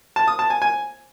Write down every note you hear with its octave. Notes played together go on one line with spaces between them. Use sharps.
A5
D#6
A5
G#5
G#5